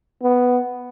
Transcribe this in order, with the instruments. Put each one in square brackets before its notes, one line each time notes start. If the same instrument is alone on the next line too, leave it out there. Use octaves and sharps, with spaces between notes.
[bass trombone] B3